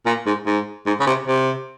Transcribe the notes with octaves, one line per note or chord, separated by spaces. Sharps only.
A#2
G#2
G#2
G#2
C#3
C3
C3